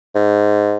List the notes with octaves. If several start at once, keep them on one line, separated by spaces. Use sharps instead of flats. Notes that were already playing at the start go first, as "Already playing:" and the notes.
G#2